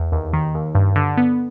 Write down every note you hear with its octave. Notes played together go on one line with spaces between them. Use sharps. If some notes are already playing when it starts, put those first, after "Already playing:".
Already playing: E2
D#2
D#3
D#2
G2
D3
B3